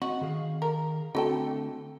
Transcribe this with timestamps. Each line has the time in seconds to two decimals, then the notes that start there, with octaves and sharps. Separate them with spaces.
0.02 C4 F#4 D#5
0.21 D#3 G#4 F5
0.62 A#4
1.15 D3 A3 C4 F#4 A4 G5